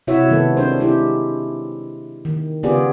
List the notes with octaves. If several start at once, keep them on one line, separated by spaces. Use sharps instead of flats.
C3 E4 F#4 C#5 E5
C3 D#3 G#3 B3 A4
C4 D4 C5
G#3 C4 E4 G4
D#3
C#3 B3 F4 G4 G#4 D5